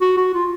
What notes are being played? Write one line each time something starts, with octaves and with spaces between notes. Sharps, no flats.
F#4
F#4
F4